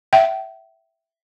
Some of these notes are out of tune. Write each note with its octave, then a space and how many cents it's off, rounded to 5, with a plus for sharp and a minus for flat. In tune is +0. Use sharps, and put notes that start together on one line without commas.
E5 +5 G5 -35